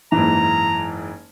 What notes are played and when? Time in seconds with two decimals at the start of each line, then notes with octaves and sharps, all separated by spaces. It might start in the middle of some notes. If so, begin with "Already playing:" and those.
0.12 F#1 G#2 E3 A#5